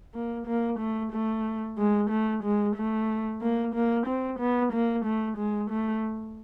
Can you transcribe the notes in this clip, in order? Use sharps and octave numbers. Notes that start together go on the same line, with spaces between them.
A#3
A#3
A3
A3
G#3
A3
G#3
A3
A#3
A#3
C4
B3
A#3
A3
G#3
A3